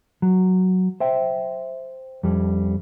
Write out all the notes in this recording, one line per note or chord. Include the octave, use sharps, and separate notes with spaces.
F#3
C5 E5 G5
F2 G3